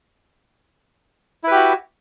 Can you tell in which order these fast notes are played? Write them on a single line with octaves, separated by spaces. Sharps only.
E4 B4 G4 F#4